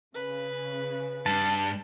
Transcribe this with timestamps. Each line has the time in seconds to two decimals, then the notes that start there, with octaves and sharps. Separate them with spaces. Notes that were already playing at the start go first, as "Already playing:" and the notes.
0.15 C#3 B4
1.26 G2 A5